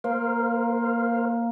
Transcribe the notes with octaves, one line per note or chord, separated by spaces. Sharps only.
A#3 A#4 C5 F5